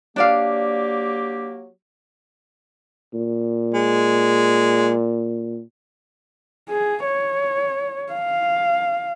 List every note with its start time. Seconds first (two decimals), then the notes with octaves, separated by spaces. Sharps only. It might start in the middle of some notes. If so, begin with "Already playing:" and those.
0.16 F#3 A#3 D4 G4 D5 F5
3.14 A#2
3.74 G#3
6.69 G#4
7.05 C#5
8.13 F5